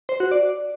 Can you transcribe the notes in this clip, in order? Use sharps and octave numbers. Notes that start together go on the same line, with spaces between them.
C5
F#4
D5